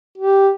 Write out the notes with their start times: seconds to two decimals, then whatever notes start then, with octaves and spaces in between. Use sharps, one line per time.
0.18 G4